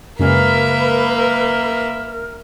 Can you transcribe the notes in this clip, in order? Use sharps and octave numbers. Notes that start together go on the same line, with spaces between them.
F#2 C#3 G#3 A#3 A#4 B4 E5